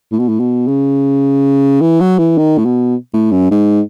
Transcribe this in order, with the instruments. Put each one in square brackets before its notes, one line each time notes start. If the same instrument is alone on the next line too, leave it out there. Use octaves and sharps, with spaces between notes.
[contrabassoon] A2
B2
A2
B2
C#3
E3
F#3
E3
D#3
A2
B2
A2
F#2
G#2